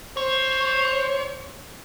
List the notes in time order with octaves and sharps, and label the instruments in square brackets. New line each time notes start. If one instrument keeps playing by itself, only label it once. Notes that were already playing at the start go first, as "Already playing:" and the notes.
[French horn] C5 [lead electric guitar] C#5